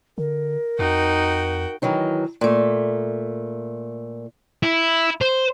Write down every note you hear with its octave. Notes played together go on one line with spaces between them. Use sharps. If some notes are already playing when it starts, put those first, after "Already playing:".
D3 A#4
F2 D#4 F#4 G5
D#3 E3 F#3 D#4
A#2 A3
E4
C5